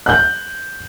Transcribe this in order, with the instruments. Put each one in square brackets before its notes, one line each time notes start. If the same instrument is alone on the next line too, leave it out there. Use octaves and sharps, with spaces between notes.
[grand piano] F#6 G6